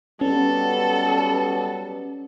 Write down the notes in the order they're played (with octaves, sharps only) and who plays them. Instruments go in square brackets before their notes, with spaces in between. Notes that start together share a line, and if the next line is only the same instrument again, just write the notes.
[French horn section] F#3 G3 B3 [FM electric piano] C#4 [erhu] A4